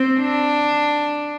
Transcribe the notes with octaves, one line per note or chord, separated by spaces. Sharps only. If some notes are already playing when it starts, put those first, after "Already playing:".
Already playing: C4
D4